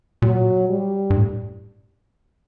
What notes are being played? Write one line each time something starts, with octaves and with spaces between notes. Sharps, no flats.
A#2 F#3
G3
G2
A2